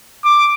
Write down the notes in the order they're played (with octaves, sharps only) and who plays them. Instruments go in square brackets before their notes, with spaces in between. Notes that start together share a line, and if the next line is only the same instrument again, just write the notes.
[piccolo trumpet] D6